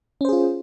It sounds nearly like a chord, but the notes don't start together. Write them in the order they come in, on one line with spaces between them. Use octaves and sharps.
C#4 C5 G#4 F4